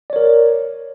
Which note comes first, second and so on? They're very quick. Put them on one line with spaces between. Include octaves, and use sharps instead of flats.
D5 C#5 A#4